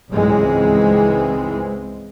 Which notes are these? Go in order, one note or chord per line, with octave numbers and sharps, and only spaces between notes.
C#2 G#2 E3 G#3 C4